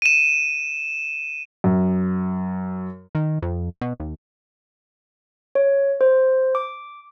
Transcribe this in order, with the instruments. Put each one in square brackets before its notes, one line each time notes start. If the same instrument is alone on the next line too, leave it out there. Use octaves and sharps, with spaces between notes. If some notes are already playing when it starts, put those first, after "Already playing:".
[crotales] D#7 E7
[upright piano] F#2
[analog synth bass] D#3
F2
B2
D#2
[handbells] C#5
C5
D6